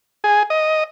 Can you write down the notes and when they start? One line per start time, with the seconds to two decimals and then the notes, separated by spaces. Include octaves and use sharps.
0.24 G#4
0.50 D#5